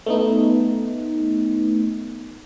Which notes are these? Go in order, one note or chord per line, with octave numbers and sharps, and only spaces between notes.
A3 B3 D#4